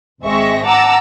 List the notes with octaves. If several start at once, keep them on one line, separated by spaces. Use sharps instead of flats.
G#1 G#3 C4 E5 C#6 A#6
F#5 A5 A#5 D6 E6